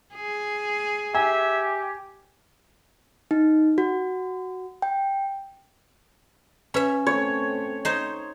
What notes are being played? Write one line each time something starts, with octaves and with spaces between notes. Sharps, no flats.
G#4
G4 E5 G#5
D#4
F#4
G5
C#4 B4 E5 B5
A3 C4 C#5
D#4 C5